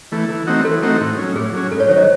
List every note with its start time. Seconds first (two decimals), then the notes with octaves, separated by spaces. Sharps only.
0.12 E3 A3
0.29 E3
0.47 A3 C4 D#4 F#4
0.65 E3 A4
0.82 A3 C4 D#4 F#4
1.00 A2
1.18 F#3 C#4
1.35 A2 G#4
1.53 F#3 C#4
1.71 G#2 A4
1.80 C#5
1.89 D#3 F#3 C5
1.97 D#5